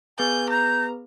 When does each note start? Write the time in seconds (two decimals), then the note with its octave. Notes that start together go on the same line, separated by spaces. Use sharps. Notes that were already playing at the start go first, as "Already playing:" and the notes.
0.19 B3 G#4 B4 G#5 G6
0.50 A#5 G6